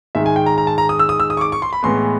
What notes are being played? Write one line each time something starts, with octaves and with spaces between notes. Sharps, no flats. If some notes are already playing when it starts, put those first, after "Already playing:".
G#2 D#3 G#3 E5
G#5
G5
A#5
A#5
A5
A#5
D#6
E6
D#6
E6
D#6
C#6
D6
C#6
C6
B5
A2 E3 G#3 B3 C6